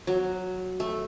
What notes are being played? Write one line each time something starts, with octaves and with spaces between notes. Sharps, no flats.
F#3
A3